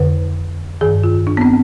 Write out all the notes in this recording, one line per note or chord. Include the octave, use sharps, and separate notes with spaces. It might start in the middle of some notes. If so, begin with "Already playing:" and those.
Already playing: F2 D3 B4
G2 D#3 G#4
F4
D4
B3
C4